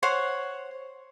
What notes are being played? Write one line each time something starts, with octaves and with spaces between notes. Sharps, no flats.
C5 C#5 F#5